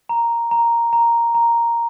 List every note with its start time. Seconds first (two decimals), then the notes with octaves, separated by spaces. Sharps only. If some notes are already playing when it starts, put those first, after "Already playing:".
0.09 A#5
0.51 A#5
0.93 A#5
1.35 A#5